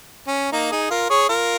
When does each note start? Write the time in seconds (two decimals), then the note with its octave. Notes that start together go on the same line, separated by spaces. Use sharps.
0.27 C#4
0.52 A#3 D#4
0.71 D#4 G#4
0.90 F4 A#4
1.10 G#4 C#5
1.29 F4 A#4